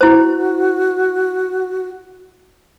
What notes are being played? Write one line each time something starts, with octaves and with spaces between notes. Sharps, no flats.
E4 F#4 C5